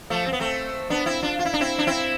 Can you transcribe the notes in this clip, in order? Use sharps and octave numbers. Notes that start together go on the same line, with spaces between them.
F3 A3
C4
B3
A3 C4
B3 D4
C4 E4
D4 F4
F4
E4
D4
C4 E4
D4
C4 E4